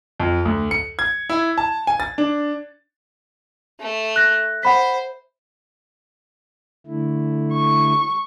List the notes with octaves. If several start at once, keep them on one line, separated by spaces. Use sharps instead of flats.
F2
D2
C#7
G#6
E4
A5
G#5
A6
D4
A3
F#6 A#6
C5 F#5 B5 B6
D3 A3 E4
C#6